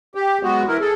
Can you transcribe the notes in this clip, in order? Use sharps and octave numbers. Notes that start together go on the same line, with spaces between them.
G4
F#3 G#3 B3 F#4
E3 E4 A#4
G#4 A4